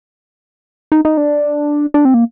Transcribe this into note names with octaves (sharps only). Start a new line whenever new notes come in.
D#4
D#4
D4
D4
C4
A#3